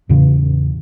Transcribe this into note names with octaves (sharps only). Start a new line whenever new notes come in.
E2 A2 C#3 E3